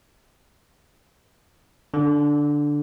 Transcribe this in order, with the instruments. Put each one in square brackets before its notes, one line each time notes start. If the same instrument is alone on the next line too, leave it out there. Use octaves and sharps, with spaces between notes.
[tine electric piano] D3